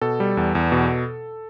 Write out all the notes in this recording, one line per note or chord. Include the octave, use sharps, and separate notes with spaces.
B2 A4
G3
E2
E2
B2